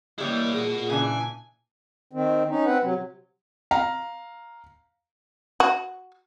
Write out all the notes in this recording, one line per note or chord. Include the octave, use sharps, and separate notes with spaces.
E3 G3 G#3 A#3 E4 C#5
A#2 F#4 G#4 D#5
C#3 E3 D4 G#5
D#3 C4
C#4 D#4
C4 B4 F#5
C3 F#3
F5 A#5
F#4